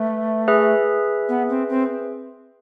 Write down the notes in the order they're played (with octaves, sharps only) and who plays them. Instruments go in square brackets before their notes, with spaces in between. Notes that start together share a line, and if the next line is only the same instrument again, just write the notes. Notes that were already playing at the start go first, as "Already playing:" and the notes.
Already playing: [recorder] A3 [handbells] B4 E5
[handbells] G#4 B4 E5
[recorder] B3
C4
C4